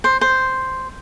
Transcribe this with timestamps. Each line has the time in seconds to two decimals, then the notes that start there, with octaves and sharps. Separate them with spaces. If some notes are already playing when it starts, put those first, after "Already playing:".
0.04 C5
0.21 C5